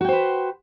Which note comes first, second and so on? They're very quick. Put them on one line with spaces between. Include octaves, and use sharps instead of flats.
F#4 G5 C5 B4